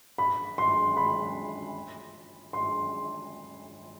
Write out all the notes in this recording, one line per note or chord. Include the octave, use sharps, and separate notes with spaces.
B5
C6
B5
C6